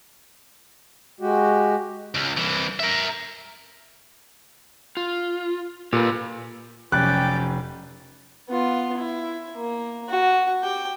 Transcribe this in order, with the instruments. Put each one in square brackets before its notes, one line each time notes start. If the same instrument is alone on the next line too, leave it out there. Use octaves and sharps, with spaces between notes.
[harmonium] G#3 F#4 G4
[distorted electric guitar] C#2
C2 E3
A#4 E5
[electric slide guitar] F4
[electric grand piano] A#2 [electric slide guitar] G4 A4 B4
[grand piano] F1 [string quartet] F#3 C#4 G4 [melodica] D5 G5 D6 [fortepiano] F#6
[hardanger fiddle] B3 F4
E4
A#3
F#4
G4 G5